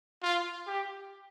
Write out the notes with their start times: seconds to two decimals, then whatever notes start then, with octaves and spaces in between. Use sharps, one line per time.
0.23 F4
0.67 G4